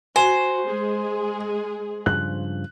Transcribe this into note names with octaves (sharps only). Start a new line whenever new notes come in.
F#4 C5 G#5
G#3 G#4
G2 C#3 F3 F#6